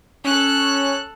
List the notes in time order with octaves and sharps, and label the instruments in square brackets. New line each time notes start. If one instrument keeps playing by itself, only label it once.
[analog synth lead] C#4 [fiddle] A4 F#6